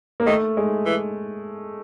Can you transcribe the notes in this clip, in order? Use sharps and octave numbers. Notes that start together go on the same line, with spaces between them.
A#3
D#3 A3
G#3
E3